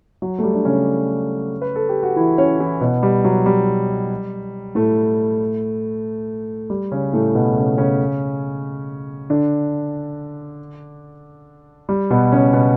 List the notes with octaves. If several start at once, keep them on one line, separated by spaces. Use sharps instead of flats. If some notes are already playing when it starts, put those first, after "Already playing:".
F#3
A3
G3
D4
C#3 C#4
B4
A4
G4
F#4
E3 E4
C#4 C#5
E3 E4
B2 B3
G3
F#3
G3
A2 A3
G3
C#3 C#4
A2 A3
B2 B3
C#3 C#4
C#3 C#4
D3 D4
G3
B2 B3
C#3 C#4
B2 B3